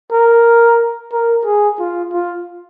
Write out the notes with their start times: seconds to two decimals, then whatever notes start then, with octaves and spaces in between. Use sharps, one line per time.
0.12 A#4
1.12 A#4
1.45 G#4
1.79 F4
2.13 F4